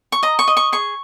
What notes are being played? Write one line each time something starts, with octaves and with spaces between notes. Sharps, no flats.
C#6
D#5 A#5
C#6
D#5
C#6
G#4 C#6